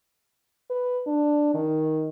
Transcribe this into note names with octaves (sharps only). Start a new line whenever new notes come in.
B4
D4
D#3